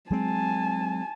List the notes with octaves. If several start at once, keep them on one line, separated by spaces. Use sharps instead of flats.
F#3 G#3 C4 G#5 A5